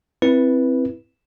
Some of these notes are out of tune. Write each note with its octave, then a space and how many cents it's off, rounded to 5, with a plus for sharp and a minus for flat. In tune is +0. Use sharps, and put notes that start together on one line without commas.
C4 +0 E4 +0 B4 -10